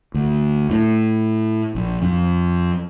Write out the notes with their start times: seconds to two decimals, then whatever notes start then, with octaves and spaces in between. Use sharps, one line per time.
0.14 D2
0.70 A2
1.75 A#1
2.02 F2